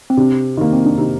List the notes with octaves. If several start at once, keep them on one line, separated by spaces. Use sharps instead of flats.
C4
C3 D4
D#3 A#3
C4
D4
C3 D#4